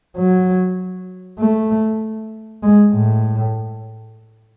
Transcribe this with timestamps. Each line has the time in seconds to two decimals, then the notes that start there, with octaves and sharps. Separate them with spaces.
0.17 F#3
1.39 A3
2.63 G#3
2.93 A2